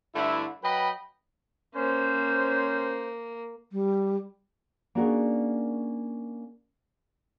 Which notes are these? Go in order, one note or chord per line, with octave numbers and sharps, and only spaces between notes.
G2 D3 A3 E4
F#3 B4 D#5 G5 B5
A#3 C#4 C5
G3
A#3 C#4 D4 F#4 G#4 A#4